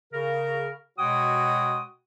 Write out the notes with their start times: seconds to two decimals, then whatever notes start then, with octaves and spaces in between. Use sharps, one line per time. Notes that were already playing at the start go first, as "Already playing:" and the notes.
0.13 C#3 A#4
0.99 B2 G#3 F#4 C#5 G5 D#6